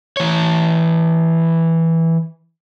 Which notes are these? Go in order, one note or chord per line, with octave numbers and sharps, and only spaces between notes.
E3 C#5